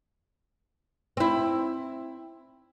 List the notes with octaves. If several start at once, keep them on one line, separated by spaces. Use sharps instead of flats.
C4 E4